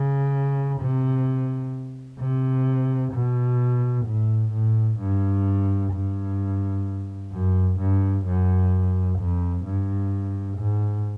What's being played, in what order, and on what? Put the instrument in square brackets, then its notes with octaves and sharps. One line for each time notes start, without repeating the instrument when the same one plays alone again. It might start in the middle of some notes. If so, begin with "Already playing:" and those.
Already playing: [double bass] C#3
C3
C3
B2
A2
A2
G2
G2
F#2
G2
F#2
F2
G2
G#2